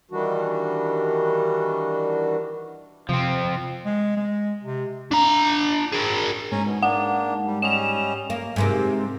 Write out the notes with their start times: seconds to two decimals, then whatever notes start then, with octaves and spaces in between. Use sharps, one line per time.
0.11 D#3 E3 G3 D4 F#4
3.09 C3 F3 C4
3.86 G#3
4.16 G#3
4.63 C3
5.12 D4 A#5
5.92 G#4 A#4
6.52 G#2 C#4 G#5 A#5
6.66 B2
6.83 A#3 D4 F#5
7.47 G3
7.62 G3 C#4 D#5 E7 F7
8.30 A#3
8.56 G#2 C3 A#3